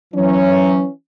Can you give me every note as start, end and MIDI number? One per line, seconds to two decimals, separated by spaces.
0.14 0.90 52
0.14 0.84 54
0.14 0.90 61